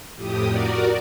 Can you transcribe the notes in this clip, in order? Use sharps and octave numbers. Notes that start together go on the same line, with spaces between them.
F2 A2 G4 D#6
F#4 A#4 D5